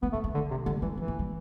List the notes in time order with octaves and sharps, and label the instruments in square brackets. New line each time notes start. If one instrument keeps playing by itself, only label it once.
[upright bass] A3 [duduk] B3
[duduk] A3 [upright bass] B3
[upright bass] A3
[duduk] D3
C3
[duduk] D3 [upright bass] G3
[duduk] E3 [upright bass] G3
[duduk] E3 [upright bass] G3
[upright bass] A3
G3